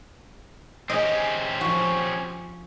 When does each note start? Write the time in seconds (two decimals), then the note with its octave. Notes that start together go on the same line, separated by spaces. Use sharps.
0.90 C4 C#4 G4 G#4 D#5
1.61 F3 F#4